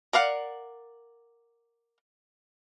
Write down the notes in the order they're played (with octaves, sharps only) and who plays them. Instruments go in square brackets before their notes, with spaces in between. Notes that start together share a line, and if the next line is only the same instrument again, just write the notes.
[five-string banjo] A#4 D5 F5 F#5